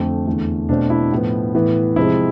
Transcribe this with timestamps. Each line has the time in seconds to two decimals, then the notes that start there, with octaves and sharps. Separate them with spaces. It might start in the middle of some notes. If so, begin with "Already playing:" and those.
Already playing: F2 D3 A3 C4
0.26 E2 D3 A3
0.69 B2 A3 C4 D4
0.90 E4
1.12 A2 F3 B3
1.55 A2 E3 B3
1.96 C3 F3 G#3 C4 E4